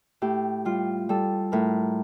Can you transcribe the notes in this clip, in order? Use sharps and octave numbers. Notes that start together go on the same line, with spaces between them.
A2 G4
G3 F4
G3 A4
A2 A#4